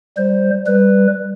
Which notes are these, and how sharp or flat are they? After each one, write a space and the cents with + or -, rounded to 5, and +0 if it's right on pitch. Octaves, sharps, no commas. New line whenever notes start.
G3 +0 C5 +0
G3 +5 B4 +0